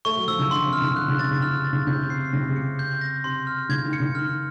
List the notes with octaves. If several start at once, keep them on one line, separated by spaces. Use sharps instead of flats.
A3 C#6
F#3
F3 E6
C#3
D3 C6
C3
F6
C#3
D3 F#6
C#3
C3 A6
C#3
C#3 F6
A6
C#3
C#3 G6
C3
C3 C7
C#3 A#6
C3
C#3
C#7
G6
A#6
C3 C6
F6
C#3 G#6
D#3
C#7
C#3
D#3 F6